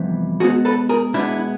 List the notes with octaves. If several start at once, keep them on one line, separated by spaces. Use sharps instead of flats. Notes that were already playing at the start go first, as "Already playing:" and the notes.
Already playing: F2 C3 E3 G3 B3
B2 G#3 B3 F#4 G#4
A4 B4
G#4 A#4
B2 G#3 B3 D4 E4